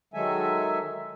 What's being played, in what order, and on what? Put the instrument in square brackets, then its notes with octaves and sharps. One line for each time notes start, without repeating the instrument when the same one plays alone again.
[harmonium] D#3 F#3 G#3 A4 E5 G#5